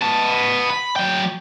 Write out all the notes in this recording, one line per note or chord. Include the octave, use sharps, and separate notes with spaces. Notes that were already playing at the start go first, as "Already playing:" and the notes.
B3 A5
B5
F#3 G5